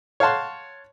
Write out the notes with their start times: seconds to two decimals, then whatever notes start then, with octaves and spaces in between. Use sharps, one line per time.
0.20 C#5 F5 F#5 A5 C6